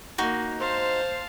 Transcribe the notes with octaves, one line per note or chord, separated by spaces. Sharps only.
A#3 D#4 F#4
C5 F5 A5